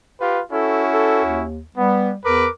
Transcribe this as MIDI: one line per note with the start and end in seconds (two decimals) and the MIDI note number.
0.20 0.41 65
0.20 0.41 67
0.20 0.41 71
0.52 1.44 61
0.52 1.44 64
0.52 1.44 66
0.52 0.83 69
0.93 1.22 69
1.25 1.61 39
1.76 2.17 55
1.76 2.10 59
2.25 2.47 40
2.25 2.48 70
2.25 2.48 71
2.25 2.48 86